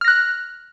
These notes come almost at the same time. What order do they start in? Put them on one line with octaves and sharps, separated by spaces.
F6 A#6 F#6